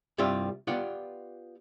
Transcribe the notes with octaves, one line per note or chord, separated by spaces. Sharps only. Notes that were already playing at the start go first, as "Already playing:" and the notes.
C2 G2 G3 C4 F4 E5
B3 F4 G4 D5 F#5